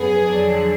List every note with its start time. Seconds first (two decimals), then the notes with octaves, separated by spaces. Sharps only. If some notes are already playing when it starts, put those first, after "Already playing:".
Already playing: F#2 F3 B3 G#4
0.27 F2 D3 F#3 D4